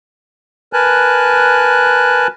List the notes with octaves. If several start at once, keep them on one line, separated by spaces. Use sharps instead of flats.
A#4 B4 G#5 A5 F#6